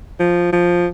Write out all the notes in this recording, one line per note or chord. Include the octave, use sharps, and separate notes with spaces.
F3
F3